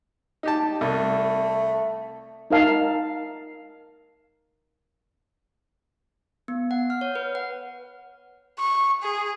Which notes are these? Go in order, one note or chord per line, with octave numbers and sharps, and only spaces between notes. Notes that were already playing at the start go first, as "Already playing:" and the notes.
D#4 G4 A5
C2 A3
D#4 A#4 F5 A5
B3
F#5
F6
C#5
B4
F#5
C#6
G#4